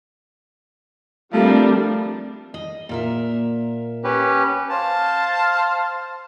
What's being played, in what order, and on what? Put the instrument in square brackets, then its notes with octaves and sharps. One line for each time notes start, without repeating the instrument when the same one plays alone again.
[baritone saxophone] F3 [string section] G3 D4 [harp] A3 A4 A#4 [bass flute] C4
[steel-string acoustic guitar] D#5
A#2 A#4 E5
[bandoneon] C#4 G4 B4
[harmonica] C5 F5 A5